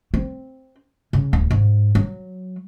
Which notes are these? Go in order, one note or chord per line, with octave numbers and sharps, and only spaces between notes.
C4
C#3
D1
G#2
F#3